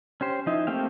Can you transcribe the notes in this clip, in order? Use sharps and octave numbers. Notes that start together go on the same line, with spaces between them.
C#4 G4 C5
F3 D#4 E4
A3 A#3 C4 G4 F5